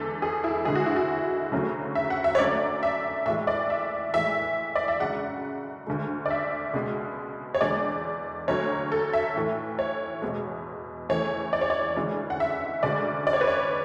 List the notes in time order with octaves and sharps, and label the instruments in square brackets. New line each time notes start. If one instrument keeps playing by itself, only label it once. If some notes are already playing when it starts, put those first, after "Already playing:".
Already playing: [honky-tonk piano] E2 D3 G#3 A4
G#4
E4
D2 D3 G#3 G#4
F#4
E4
F#4
D2 C#3 F#3 A3
E5
F#5
E5
C#5
F#2 D3 F#3 A3 D5
E5
A2 E3 G#3 E5
D5
E5
A2 E3 G#3 E5
D5
E5
F#2 C#3 G#3 F#5
D2 D3 G#3
D5
E5
C#2 B2 G#3
C#5
E2 D3 G#3 D5
D2 D3 F#3 A3 C#5
A4
E5
A2 E3 A3
C#5
E2 B2 G#3
E2 C#3 E3 A3 C#5
D5
C#5
D5
D2 C#3 E3 G#3
F#5
E5
D2 C#3 G#3 D5
D5
C#5
B4
C#5